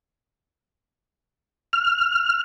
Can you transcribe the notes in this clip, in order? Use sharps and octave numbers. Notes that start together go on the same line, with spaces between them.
F6